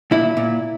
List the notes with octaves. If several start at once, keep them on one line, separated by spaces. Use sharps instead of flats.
A#2 E4
A#2